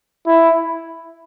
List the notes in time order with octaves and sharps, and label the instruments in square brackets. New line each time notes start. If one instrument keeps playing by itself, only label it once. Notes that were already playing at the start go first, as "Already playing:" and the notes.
[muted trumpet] E4